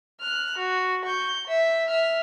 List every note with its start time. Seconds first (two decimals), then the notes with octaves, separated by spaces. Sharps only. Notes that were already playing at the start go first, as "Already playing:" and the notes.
0.21 F6 F#6
0.58 F#4
1.05 C#6 G6
1.47 E5
1.88 E5 F6